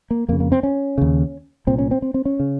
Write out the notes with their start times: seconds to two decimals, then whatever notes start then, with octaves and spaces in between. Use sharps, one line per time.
0.11 A#3
0.28 F2 A#3
0.32 C#3
0.40 A#3
0.52 C4
0.63 C#4
0.98 D#2 C#3
1.67 C2 A#2 C4
1.78 C#4
1.91 C4
2.02 C4
2.14 C4
2.25 C#4
2.40 C#3